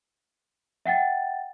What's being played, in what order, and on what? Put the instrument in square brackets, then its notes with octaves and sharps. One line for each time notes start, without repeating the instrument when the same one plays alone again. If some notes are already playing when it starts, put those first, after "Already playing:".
[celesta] E5 F#5 G5 A6